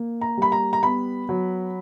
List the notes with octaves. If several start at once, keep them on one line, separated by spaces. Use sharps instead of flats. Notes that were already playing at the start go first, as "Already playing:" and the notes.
Already playing: A#3
A#5
G3 B5
A#5
A#5
B3 B5
F#3